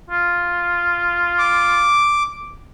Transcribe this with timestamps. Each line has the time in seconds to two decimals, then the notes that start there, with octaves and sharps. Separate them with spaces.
0.10 F4
1.38 D6